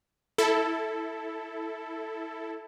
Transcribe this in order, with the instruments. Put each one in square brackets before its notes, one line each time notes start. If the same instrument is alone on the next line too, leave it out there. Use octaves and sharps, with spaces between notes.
[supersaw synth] E4 A4